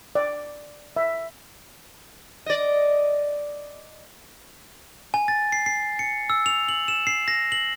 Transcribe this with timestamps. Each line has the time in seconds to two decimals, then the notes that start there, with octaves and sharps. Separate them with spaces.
0.15 D5
0.96 E5
2.46 D5 D#5
5.14 G#5
5.28 A6
5.52 C7
5.66 C7
5.99 C#7
6.30 E6
6.46 F7
6.69 F#7
6.88 E7
7.07 C7
7.28 A#6
7.52 F#7